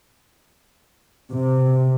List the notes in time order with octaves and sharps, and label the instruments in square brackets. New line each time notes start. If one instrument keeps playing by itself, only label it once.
[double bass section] C3